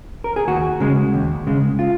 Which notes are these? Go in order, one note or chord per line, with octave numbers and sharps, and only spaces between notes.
A#4
G#4
D#2 F#4
C#3 G#3
D#2
C#3 G#3
F4